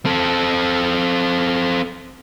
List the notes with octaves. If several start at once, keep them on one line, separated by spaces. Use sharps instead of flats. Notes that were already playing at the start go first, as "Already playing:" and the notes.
C4 A4